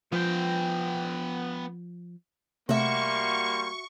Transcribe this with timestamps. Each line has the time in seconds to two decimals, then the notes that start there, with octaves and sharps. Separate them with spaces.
0.12 F3 B3 G5
2.69 C3 G3 A3 A#3 F#4 E5 C6 C#6